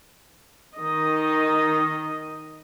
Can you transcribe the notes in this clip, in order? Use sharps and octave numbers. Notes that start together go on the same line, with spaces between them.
D#3 D#5